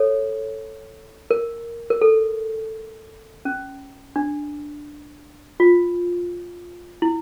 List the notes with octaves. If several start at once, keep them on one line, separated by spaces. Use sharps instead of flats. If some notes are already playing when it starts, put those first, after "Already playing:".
Already playing: A4 C#5
A#4
A#4
A4
C#4
D4
F4
E4